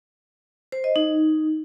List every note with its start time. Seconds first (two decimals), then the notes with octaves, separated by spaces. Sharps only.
0.72 C5
0.84 D#5
0.96 D#4